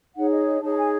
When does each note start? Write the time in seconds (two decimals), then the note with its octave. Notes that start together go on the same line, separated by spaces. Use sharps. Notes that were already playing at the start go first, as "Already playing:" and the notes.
0.15 D#4 G#4 C#5 F#5
0.31 D#5
0.47 D#5
0.62 D#4 G#4 C#5 A5
0.77 G#5